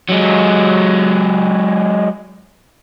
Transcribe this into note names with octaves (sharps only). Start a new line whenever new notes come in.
F#3 G#3